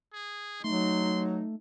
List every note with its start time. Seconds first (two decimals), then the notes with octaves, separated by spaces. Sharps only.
0.14 G#4
0.64 F#3 A3 D#4 C6